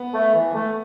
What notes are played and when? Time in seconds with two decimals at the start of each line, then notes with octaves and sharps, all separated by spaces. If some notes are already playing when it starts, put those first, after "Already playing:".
Already playing: B3
0.14 A3
0.34 E3
0.54 A3